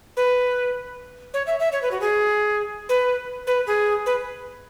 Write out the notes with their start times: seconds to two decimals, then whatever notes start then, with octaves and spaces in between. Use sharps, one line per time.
0.17 B4
1.34 C#5
1.47 E5
1.60 E5
1.72 C#5
1.82 B4
1.91 F#4
2.01 G#4
2.89 B4
3.47 B4
3.67 G#4
4.06 B4